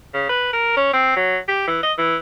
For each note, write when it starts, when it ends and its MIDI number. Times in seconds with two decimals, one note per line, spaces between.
0.14 0.27 49
0.29 0.50 71
0.53 0.73 70
0.77 0.93 61
0.93 1.15 60
1.16 1.38 54
1.48 1.66 67
1.67 1.79 52
1.83 1.93 75
1.98 2.16 52